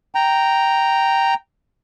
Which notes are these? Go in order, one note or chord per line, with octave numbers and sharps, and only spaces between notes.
G5 A#5